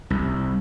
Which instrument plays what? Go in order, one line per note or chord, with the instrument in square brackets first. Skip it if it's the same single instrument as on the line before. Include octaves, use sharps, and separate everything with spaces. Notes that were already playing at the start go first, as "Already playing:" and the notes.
[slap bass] C2